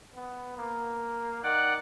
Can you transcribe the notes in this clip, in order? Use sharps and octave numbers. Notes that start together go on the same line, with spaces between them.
B3
A#3
D#3 D5 F#5 F#6